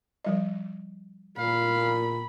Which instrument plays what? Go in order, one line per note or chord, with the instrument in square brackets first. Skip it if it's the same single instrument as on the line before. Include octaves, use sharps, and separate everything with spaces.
[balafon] F3 G3 D#5
[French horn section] A#2 [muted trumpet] F5 [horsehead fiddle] B5